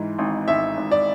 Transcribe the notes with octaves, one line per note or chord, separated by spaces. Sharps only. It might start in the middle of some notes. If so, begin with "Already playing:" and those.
Already playing: G#2 E3
G#1
G#1 E5
G#1
D5